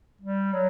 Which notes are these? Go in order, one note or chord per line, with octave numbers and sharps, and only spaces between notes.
G3
F#3